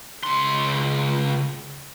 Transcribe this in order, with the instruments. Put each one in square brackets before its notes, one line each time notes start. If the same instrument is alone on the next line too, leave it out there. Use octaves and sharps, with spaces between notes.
[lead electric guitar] C#2 C6